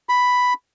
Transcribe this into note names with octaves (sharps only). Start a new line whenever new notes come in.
B5